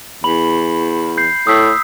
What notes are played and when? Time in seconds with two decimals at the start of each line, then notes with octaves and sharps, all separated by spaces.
0.24 E2 B5 F#7
1.18 G6 C7
1.47 A2 D#6 E6 B6